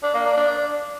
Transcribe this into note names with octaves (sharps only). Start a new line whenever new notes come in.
D4
A#3
D4
D4